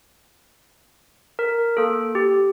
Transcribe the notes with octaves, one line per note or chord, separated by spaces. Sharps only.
A#4
A#3 A4
G4